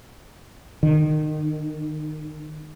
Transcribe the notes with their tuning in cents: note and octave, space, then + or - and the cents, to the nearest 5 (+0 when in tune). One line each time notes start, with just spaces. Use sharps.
D#3 -25